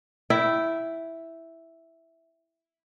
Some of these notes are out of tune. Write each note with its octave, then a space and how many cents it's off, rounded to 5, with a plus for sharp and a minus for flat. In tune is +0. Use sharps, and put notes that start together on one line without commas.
E4 +0 G5 -15